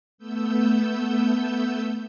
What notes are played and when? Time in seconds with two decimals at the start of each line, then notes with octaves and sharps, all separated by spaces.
0.18 A3 B3 E6 G6